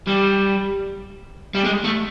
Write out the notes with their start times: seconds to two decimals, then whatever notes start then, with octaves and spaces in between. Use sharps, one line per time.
0.07 G3
1.55 G3
1.65 G#3
1.84 A3